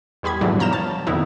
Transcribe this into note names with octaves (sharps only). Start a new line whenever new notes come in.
E2 G3 G#4 B5 G#6
G#2 B2 D3 E3 F#3 G3
B2 F3 A#5 F6 G6 E7
C#5 A5
F2 A#2 D#3 B3 D#4 E4